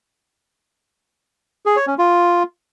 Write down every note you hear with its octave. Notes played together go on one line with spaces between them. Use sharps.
G#4
C#5
C#4
F4